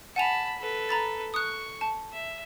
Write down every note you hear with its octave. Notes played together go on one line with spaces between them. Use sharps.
F#5 G#5 A5 B5 F7
A4 B4
A#5 B5 A6
C#6 D#6 F#6
A5
E5